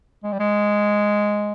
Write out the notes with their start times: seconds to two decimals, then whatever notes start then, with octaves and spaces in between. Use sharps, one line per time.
0.24 G#3
0.32 G3
0.40 G#3